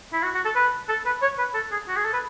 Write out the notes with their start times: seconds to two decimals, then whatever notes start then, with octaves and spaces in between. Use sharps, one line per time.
0.13 E4
0.23 F#4
0.34 F#4
0.45 A4
0.56 B4
0.89 A4
1.06 B4
1.22 C#5
1.38 B4
1.54 A4
1.72 G#4
1.88 F#4
1.96 G#4
2.04 A4
2.13 B4